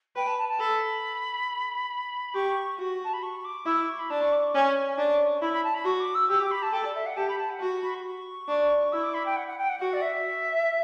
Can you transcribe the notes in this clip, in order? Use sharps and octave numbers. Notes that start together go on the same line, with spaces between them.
B4 G5
A5
A5
A5
A4 B5
G4 C#6
F#4
A5
B5
C#6
D6
E4 E6
D6
C#6
B5
D4 A5
C#6
D6
C#6
C#4
D4
E4 B5
B5
A5
B5
F#4 C#6
D6
E6
G4 E6
D6
B5
A5
A4 G5
D5
E5
F#5
G4 A5
B5
A5
F#5
F#4
B5
C#6
C#6
D4
E4 E6
D6
B5
G5
F#5
F#5
G5
F#5
F#4 F#5
D5
E5